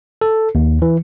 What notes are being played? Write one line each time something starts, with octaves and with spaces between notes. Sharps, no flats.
A4
D#2
E3